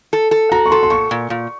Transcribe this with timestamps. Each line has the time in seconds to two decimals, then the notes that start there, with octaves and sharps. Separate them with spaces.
0.13 A4
0.31 A4
0.52 F#4 A#5
0.66 C#6
0.71 A4 C6
0.83 C6
0.90 A#2 C#6
1.11 A#2
1.30 A#2